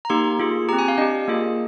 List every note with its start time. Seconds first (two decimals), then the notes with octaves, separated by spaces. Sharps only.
0.05 A#5
0.10 A#3 D#4 G4 C6
0.39 A#3 F4 G#4
0.68 G4 A#5
0.73 C4
0.79 G#5
0.88 F5
0.98 D4 G4 D#5
1.28 A#3 F4 G#4